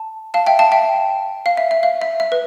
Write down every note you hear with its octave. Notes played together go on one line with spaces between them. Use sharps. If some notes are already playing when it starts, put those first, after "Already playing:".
Already playing: A5
F5 A5
E5 G5
F5 A5
E5 G5
F5
E5
E5
F5
E5
E5
B4